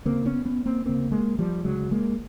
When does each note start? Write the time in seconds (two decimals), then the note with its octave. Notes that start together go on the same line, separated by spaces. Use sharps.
0.05 D2 C#3 A#3 C4
0.26 B3 C#4
0.45 B3 C#4
0.66 A#3 C4
0.85 D2 C#3 A#3 C4
1.11 G#3 A#3
1.39 F3 G3
1.64 D2 C#3 F#3 G#3
1.91 G#3 A#3